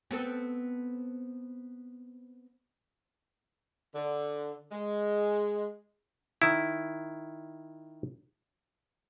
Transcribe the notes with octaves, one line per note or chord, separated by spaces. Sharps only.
B3 C4 A4
D3
G#3
D#3 E4